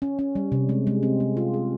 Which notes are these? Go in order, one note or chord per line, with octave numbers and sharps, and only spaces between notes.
C#4
C#4
G3
C3
G#3
G#3
C4
C4
F4
G#4